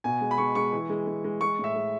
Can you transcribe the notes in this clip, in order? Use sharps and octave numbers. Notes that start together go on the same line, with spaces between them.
B2 G#5
G#3
B5
G#3 C#6
G#3 C#6
E3
G#3
G#3
G#3
G#3 C#6
A2
E5
G#3